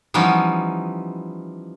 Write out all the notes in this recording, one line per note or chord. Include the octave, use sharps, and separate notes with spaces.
E3 F3 G3 B3 C#4 D#4